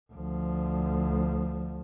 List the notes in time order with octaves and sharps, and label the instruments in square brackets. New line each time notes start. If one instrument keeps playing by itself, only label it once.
[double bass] D2 F3